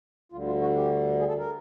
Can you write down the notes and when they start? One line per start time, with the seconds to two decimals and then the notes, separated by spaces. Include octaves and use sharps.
0.32 D2 D3 G3 F4
0.46 F4
0.61 F#4
0.76 G4
1.19 G#4
1.28 A4
1.39 A#4